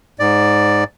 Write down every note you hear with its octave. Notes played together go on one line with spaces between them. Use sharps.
G#2 D5